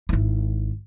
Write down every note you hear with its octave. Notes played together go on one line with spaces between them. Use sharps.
G#1 E4